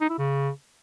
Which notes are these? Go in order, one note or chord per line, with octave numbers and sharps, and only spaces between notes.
D#4
E4
C#3